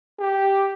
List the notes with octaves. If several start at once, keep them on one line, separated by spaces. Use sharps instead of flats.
G4